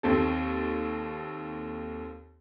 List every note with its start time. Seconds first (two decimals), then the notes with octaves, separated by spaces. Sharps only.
0.03 D#2 C4 A4